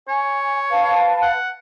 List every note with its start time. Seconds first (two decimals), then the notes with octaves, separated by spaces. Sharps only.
0.08 C#5 G#5
0.70 B4 F5 A5
1.22 F#5